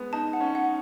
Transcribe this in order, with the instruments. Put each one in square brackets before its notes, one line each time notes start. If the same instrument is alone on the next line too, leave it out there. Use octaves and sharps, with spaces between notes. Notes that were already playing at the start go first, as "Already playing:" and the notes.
Already playing: [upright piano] G#3 B3
[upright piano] D#4 [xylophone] A5
[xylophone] F#5
[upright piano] C#4
[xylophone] F#5